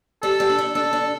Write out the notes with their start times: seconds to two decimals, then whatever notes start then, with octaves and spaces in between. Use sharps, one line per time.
0.22 G3 A4
0.40 G3
0.50 D4
0.59 E4
0.75 D4 A4
0.93 D4